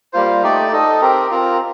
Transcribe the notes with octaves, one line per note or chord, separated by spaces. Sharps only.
G3 A#3 F4 C5
A3 D#4 G4 D5
D#4 A4 D#5
C4 G4 A#4
C4 F4 A#4